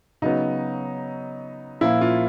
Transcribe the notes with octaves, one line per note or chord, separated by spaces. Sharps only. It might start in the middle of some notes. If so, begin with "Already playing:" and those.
C#3 F#3 B3 D#4
A#2 F3 A#3 E4
F4